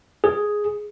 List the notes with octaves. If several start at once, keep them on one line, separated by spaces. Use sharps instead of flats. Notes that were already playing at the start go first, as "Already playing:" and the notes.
G#4